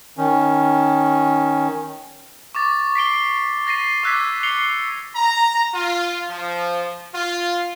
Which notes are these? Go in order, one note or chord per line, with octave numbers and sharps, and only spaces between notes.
D#3 C#4
C#6 D6 A6
B6 C7 D7 G7
A6 A#6 C7 D#7
D6 E6 F#6 G#6 B6
C7 C#7 F7 G7
A#5
F4
F3
F4